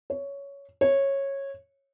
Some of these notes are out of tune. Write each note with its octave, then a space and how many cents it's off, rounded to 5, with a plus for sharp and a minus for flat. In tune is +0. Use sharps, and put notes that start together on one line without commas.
C#5 +10
C#5 -15